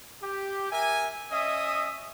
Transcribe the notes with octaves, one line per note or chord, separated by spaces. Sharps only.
G4
A#4 E5 G#5
C#4 D#5 E5 D#6